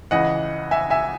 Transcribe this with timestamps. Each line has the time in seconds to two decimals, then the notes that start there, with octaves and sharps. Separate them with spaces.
0.11 C#2 C#3 E3 D#5 F#5
0.71 E5 G#5
0.90 E5 G#5